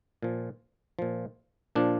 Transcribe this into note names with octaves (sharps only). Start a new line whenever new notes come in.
A#2 F3
A#2 F3
A#2 F3 D4